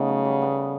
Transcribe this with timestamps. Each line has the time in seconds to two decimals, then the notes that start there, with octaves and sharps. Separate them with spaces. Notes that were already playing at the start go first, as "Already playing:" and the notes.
Already playing: C#3 A3 B3 D#4
0.09 F#3
0.25 G3
0.42 B3